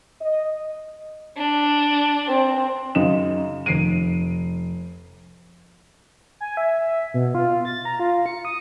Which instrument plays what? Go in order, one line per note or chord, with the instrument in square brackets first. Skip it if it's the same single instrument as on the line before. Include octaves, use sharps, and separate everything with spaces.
[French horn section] D#5
[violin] D4
[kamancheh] C4
[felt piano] F#2 C#3 D#4 E7
F1 C7 D7 D#7
[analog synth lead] G#5
E5
B2
F4
A6
A#5
F4
C#7
D#6